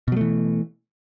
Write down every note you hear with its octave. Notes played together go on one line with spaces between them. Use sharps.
B2 E3 F#3 A3